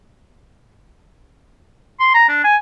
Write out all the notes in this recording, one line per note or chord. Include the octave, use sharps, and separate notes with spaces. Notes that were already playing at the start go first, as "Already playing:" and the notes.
C6
A#5
D4
G#5